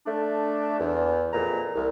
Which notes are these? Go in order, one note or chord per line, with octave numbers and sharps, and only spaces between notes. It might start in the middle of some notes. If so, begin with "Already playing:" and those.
A3 D4
E2
F2 A#2 E3 A#5
C2